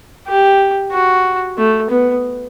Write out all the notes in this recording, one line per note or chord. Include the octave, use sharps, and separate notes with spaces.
G4
F#4
A3
B3